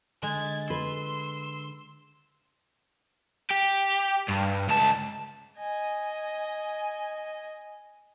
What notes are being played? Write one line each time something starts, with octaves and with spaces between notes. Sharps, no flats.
D3 G#3 G#6 A6
B4 C6 E6
G4
G2
C#2 A5
D#5 G#5